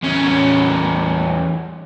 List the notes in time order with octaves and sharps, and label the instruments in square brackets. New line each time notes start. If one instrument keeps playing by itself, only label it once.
[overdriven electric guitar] E2 C#4